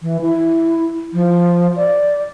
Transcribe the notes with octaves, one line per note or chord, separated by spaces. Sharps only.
E3
E4
F3
D5